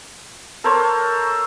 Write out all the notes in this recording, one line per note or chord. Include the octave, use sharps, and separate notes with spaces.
A4 A#4 C5 C#5